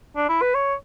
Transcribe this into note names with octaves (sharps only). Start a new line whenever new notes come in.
D4
E4
B4
C#5